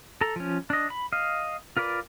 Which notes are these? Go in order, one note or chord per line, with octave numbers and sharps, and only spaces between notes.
A4 A#5
F3 C#4
D4 D#5
B5
D#5 F5
F4 A#4 B4 D5